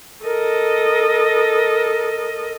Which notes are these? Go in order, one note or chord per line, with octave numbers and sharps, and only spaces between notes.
A4 A#4 D#5